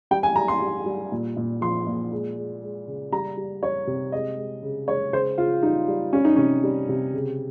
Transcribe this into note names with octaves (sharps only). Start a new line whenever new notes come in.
G3 G5
G#5
G3 A#5
C6
G3
G3
A#2
A#2
F3 C6
A#2
G#3
G#3
G#3
C#3
G3 A#5
G3
G3 C#5
C3
G#3 D#5
G#3
C#3
G#3 C#5
C#3 C5
C#3 F4
G3 D#4
G3
G3 C#4
D#4
C3 C#4
G3
C3
C#3